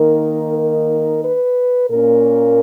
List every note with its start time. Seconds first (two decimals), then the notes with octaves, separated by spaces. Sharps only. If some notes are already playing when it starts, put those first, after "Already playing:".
Already playing: D#3 A#3 D#4 A#4
0.58 A#4
1.25 B4
1.90 A#2 A#3 C#4 A#4